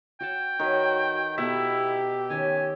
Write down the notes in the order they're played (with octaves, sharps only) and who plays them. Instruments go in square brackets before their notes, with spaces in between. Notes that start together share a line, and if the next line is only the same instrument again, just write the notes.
[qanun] F#4 F#5 A5 [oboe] G5
[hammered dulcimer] D#3 [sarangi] F#4 [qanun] B4 C#5
[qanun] B2 B3 A4 [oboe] E4 [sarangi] G4 [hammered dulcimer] E5
[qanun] D#3 C#4 [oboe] G#5